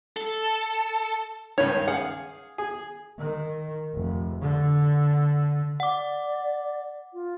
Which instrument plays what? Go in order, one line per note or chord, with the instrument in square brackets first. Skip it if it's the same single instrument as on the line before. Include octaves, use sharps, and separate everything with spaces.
[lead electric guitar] A4
[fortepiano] C#2 G2 D#3 [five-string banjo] C#5
[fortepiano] G#4 F5 [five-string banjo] F#5
[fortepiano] G#4
[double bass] D#3
F1
D3
[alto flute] D5 [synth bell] F#5 D6
[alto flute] F4